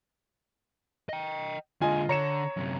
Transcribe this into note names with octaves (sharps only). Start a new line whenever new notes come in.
D#5 G5
D3 G#3 F4 D#5 G#5
D3 C#5 A#5 C#7 E7
F#2 C3